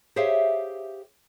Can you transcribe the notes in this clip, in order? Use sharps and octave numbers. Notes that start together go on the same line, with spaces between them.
G4 G#4 C5 C#5 E5 F5